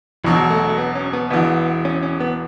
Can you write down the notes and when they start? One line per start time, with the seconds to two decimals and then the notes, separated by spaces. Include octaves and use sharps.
0.24 E1 E2 B2 E3 F#3
0.51 A3
0.64 A3
0.78 B3
0.95 C#4
1.13 B3
1.30 E1 E2 E3 B3
1.85 C#4
2.03 C#4
2.20 B3